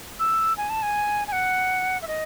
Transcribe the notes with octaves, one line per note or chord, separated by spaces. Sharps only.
E6
G#5
A5
G#5
G#5
F#5
E5
D#5